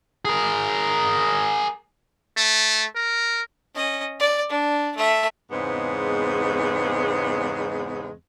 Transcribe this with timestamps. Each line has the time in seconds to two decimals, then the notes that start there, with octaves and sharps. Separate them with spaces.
0.25 G#4 A#4
2.37 A3
2.95 A#4
3.75 C#4 D#5
4.20 D5
4.50 D4
4.97 A3 E5
5.51 E2 G#2 C#3 G#3 B3 C4